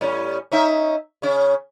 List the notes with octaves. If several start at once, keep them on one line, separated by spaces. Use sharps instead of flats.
A2 G3 C#4
C#4 D#4 E5
C#3 C#4